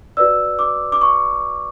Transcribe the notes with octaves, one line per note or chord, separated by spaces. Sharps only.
F#4 B4 D5 E6
D6
D6
C#6